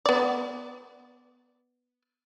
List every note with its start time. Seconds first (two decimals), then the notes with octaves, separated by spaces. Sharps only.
0.06 B3 D5